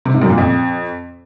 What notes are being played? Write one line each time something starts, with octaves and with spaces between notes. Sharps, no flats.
C3
G#2
F#2
A#2
F2